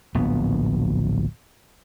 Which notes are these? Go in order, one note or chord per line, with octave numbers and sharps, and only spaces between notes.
D1 A#1 B3